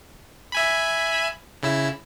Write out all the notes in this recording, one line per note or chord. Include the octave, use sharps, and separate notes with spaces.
E5 G#5 B5
C#3 E4 E6